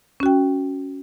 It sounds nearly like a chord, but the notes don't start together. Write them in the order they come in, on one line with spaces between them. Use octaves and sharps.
C#4 F#4 G5